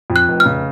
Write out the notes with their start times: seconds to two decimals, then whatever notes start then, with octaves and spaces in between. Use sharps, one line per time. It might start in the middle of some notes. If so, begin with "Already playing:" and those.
0.10 F2
0.16 F#6
0.28 F1
0.40 F6
0.45 C#3